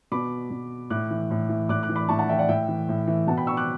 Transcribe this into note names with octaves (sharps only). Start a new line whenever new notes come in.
B2 B5 D6
B2
A2 D6 F#6
E3
A2
E3
A2 D6 F#6
D6 F#6
E3
B5 D6
A2 A5 C#6
F#5 A5
E3 E5 G5
D5 F#5
A2 E5 G5
E3
A2
E3
B2 F#5 A5
G5 B5
C#6 E6
D6 F#6